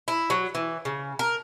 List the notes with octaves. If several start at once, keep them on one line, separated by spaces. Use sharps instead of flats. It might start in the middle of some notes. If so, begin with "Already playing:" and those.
E4
F#3
E3
C#3
A#4